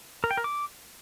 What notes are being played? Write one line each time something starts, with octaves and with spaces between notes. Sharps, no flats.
A#4
G5
A#4
D6